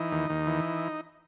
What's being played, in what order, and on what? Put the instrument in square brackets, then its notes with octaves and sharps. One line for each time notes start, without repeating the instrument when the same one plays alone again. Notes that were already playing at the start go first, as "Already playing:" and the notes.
Already playing: [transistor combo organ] E3 D#4
D#2
D#2
E3